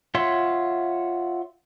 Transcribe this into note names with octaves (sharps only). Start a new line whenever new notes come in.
F4 C#5 E5 F#5 C6